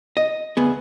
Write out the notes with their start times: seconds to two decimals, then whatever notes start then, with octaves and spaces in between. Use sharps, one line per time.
0.17 D#5
0.57 D2 B3 G#4